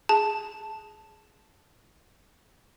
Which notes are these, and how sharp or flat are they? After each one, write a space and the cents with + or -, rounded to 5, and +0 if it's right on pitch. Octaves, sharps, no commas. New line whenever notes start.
G#4 +0 A5 +0